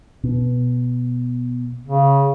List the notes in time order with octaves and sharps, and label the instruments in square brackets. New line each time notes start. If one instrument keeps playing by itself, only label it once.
[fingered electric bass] B2
[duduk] C#3